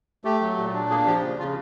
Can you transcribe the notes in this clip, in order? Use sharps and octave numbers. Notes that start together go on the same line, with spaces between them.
A3 G4
F#3
A#2
D4
A#3 G#4
F3 G4
C#3
C#3 F4